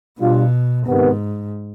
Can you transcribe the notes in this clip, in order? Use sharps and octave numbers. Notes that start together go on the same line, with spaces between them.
B2 G3 D4 F4
G#2 C3 D#3 B3